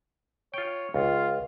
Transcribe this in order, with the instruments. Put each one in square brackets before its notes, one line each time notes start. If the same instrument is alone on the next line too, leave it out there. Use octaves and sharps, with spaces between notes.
[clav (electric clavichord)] F4 G5 [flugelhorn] C#5
[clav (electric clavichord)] C#2 [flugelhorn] F4